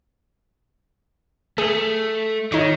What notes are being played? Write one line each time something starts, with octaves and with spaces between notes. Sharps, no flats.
A3 G#4
D#3 D#4 C#5